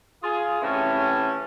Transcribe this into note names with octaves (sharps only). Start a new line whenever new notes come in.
F4 G#4
A2 C3 E3 C#4